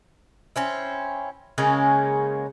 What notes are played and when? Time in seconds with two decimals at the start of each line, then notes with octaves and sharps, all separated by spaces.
0.56 C4 C#4 E4
1.58 C#3 G#3 A#3 C#4